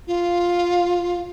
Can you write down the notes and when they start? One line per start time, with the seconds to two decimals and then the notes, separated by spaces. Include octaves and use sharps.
0.07 F4